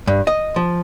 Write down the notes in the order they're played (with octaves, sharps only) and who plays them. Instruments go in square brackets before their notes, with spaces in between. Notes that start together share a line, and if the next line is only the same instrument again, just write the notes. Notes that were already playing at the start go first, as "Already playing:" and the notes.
[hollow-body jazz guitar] G2
D#5
F3